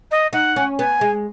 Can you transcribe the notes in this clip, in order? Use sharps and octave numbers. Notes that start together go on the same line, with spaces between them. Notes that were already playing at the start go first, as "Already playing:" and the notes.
D#5
D#4 F#5
C#4
B3 G#5
G#3